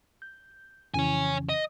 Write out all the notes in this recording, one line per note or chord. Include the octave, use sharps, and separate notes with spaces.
G6
F2 C#3 E3 C#5 G#5
D#5